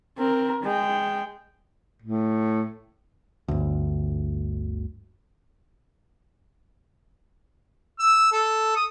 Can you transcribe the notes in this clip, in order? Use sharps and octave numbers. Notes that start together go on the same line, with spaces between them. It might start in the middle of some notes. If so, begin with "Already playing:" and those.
C4 A#4
G#3 G5
A2
G1 D2
E6
A4
D#6